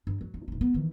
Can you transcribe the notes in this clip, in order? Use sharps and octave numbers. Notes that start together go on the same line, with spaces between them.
G2
F#3
G2
D#1 D4
B3
D#3 E3